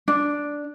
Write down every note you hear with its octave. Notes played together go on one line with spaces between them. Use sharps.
D4